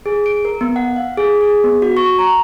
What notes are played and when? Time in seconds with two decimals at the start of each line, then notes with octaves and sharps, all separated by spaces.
0.06 G#4
0.26 D7
0.45 A#4
0.61 B3
0.76 F#5
0.96 F5
1.17 G#4
1.41 G#4
1.64 B3
1.82 F#4
1.97 C#6
2.19 A#5